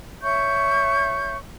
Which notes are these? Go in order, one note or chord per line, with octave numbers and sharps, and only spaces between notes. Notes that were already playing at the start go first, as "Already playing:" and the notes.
C#5 E5 C#6 G6